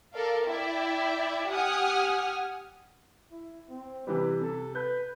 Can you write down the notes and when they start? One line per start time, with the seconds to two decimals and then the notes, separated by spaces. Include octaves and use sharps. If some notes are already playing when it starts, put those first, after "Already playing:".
0.13 A4 A#4 D5 F5
0.46 E4 D5 E5 G5
1.48 G4 F#5 G#5 D#6 F6
3.32 E4
3.70 C4
4.07 C3 E3 G3 B4
4.41 C3 A4
4.75 B4 G6